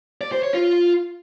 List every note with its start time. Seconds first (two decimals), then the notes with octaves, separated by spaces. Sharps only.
0.21 D5
0.32 C5
0.43 C#5
0.54 F4